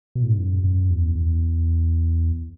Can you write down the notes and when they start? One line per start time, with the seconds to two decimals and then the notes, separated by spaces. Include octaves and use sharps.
0.15 B2
0.23 A2
0.29 G#2
0.38 F#2
0.64 F#2
0.90 E2
1.15 E2